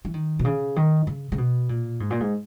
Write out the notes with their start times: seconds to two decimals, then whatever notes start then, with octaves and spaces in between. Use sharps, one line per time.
0.05 E3
0.14 D#3
0.39 B2
0.44 C#3
0.76 D#3
1.07 C#3
1.32 C#3
1.38 B2
1.69 A#2
2.00 G#2
2.10 A#2
2.20 G#2